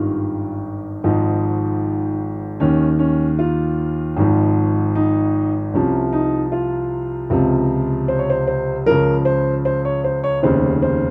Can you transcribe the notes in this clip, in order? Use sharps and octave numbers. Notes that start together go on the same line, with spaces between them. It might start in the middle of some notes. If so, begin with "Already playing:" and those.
Already playing: G#1 G2 D#3 F4
G#1 G#2 F3 D#4
D#2 D#3 C#4
C#4
F4
G#1 G#2 F3
D#4
C2 C3 F3 C#4
D#4
F4
C#2 C3 F3
C5
C#5
C5
C5
C#2 C#3 F3 A#4
C5
C5
C#5
C5
C#5
F1 D#2 C#3 C5
C5